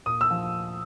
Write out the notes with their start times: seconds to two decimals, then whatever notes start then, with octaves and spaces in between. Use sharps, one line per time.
0.06 A#2 D#6
0.21 E6
0.30 F3